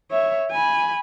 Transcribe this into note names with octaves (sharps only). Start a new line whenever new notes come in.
C#5 E5
G#5 B5